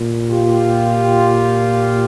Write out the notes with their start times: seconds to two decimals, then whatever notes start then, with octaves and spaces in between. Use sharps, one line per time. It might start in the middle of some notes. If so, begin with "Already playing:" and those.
Already playing: A#2
0.31 F4 G4